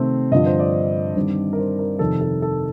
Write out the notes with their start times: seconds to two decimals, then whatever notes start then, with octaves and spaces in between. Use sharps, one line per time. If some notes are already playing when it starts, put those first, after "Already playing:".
Already playing: C3 D#3 A3 C4
0.31 G2 D3 F3 D#5
0.46 C5
0.60 D5
1.16 G2 D#3 G3 C4
1.53 A#4
1.58 C5
1.79 A#4
1.99 F2 C3 D#3 A4
2.21 A4
2.42 A4